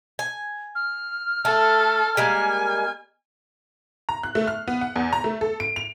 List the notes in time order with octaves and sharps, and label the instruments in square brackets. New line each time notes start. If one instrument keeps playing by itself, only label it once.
[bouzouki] G#5
[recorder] F6
[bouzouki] A3 [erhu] A4
[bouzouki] G3 G#3 A#3 [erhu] G#5
[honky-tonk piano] A#5
F#6
A3
F6
B3
F#5
E2
A#5
A3
A4
D7
F7